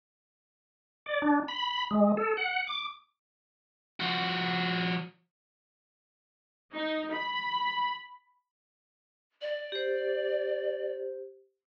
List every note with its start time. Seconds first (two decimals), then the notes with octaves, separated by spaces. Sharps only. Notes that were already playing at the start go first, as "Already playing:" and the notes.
1.06 D5
1.22 D4
1.48 B5
1.91 G#3
2.17 A4
2.37 F#5
2.67 D6
4.00 F3 F#4
6.74 D#4
7.13 B5
9.42 D5
9.72 G4 C5